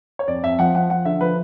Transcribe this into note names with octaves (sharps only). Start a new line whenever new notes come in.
C#5
F2 D5
F2 E5
F3 F#5
F3 F#5
F3 F#5
D3 E5
F3 B4